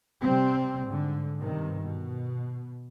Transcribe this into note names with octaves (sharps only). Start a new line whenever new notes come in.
C3 G3 C4
G#2 D3
G2 C3 D#3
B2